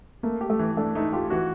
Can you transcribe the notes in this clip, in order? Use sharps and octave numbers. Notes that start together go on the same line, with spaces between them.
A3 A#3
G4
A3
E3
A3 D4
A3 D#4
F4 G4
E3 F#4